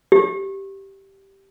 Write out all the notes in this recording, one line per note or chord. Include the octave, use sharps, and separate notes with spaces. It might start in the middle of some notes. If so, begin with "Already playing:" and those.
G4